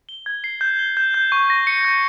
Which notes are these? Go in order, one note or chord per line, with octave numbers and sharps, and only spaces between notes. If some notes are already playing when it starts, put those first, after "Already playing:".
G7
G#6
C7
G6
G7
G6
G6
C#6
A#6
C#7
G6